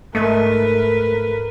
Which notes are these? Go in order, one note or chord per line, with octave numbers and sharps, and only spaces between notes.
G#2 A3 A#4 B4 D#5 E5